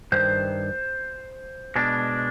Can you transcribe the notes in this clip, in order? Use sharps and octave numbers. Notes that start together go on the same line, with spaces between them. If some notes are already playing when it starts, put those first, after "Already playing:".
G2 D#3 C5
B2 G#3 D4